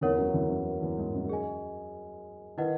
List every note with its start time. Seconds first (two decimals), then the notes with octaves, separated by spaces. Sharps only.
0.01 E2 E3 D#4 A#4 C#5 F#5
0.17 F#2 F#3
0.33 E2 E3
0.50 F#2 F#3
0.82 E2 E3
0.97 G#2 G#3
1.14 F#2 F#3
1.29 G#4 D#5 G#5
2.57 D#3 E4 B4 D#5 F#5